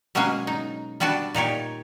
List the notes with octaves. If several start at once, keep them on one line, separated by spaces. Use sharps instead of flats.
B2 F#3 G#3 A#3 C#4 G#4
D#4
G3 B3 D4 F#4 A5
A#2 D#4 G4 C#5